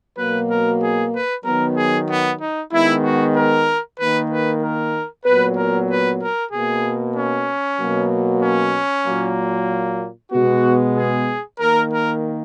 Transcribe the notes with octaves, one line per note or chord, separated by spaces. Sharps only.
B2 F#3 A#3 B4
A#4
G#4
B4
D#3 F#3 B3 A#4
G#4
B3
D#4
D#3 G#3 B3 E4
F#4
A#4
D#3 A#3 B4
B4
A#4
A#2 F#3 B3 B4
A#4
B4
A#4
B2 A#3 G#4
C#4
B2 F#3 A#3
C#4
A#2 F#3 A#3
B2 G#3 B3 F#4
G#4
D#3 A#3 A#4
A#4